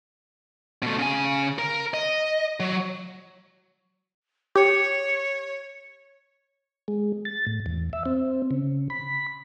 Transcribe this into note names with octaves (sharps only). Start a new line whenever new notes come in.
B2 A3
C#3 G#5
A#4
D#5
F#3
G4 C#5
G#3
A6
A2
E2
E5
C4
C#3
B5